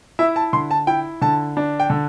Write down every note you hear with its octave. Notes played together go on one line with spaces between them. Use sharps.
E4 E5
A5
D3 C6
A5
E4 G5
D3 A5
D4
G5
D3